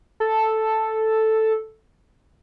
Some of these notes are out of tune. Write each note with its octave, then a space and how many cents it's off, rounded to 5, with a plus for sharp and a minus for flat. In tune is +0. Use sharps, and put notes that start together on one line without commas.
A4 +0